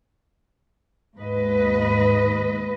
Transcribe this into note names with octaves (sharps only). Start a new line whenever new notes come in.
D#2 G#2 B4 D#5